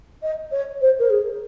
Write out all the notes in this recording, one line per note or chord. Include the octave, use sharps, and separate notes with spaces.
D#5
C#5
C5
A#4
G#4